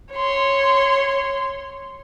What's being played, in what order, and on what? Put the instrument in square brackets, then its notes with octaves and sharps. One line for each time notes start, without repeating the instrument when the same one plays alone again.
[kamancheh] C#5 C6